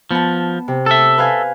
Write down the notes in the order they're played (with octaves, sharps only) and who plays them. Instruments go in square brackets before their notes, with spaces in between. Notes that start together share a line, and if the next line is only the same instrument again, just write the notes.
[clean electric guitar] F3 [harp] B3 A5
[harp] C3
[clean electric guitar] A4 E5 [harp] A5
[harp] B4 F5 G#5